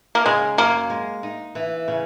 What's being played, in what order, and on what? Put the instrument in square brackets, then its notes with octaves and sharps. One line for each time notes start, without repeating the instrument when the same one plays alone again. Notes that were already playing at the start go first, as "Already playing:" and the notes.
[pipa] A#3
[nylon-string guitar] C#3 [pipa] G#3
[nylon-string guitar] F#2 [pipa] A#3
[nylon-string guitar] G#3
D#4
E3
C#3